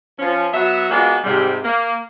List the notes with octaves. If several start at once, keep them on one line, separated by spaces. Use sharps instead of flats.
F3 C#4
F#3 B3 F#4 E5
G#3 A#3 B3 D4 F4 F#4
G#2 C3 G3
A#3